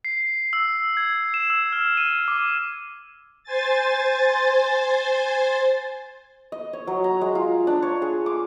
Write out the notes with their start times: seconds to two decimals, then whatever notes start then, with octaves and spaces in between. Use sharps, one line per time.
0.05 C7
0.53 E6
0.97 G#6
1.34 E7
1.50 E6
1.72 F6
1.97 D#7
2.28 D6
3.44 C5 G#5 A6
6.52 D#5
6.73 C#5
6.87 F#3
7.04 A#5
7.21 G#3
7.35 F4
7.67 D4
7.82 C#5
8.02 G#4
8.26 D6